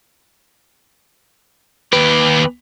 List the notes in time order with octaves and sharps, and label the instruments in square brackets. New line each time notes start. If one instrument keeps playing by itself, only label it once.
[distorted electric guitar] D#2 G4 [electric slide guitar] B4